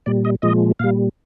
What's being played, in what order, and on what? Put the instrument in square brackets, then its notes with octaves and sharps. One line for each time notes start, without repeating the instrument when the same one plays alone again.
[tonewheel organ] A#2 G3 D5
D#5
A#2 F3 G#3 D#5
A#2 G3 F5